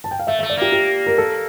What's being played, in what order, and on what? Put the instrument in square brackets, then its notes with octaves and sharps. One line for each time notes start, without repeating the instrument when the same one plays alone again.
[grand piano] A5
G5
F5
[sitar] A3 [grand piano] E5
[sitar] A3 [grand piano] E5
[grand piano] D5
[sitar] A#3 [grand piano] G4
[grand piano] G4
A#4
A4